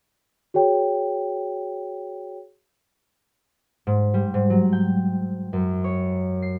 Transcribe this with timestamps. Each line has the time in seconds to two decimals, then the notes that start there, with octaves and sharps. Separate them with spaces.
0.54 F#4 G#4 C#5 G5
3.87 G#2
4.14 G3
4.34 G#2
4.50 F#3
4.73 G5
5.53 F#2
5.84 C#5
6.42 C7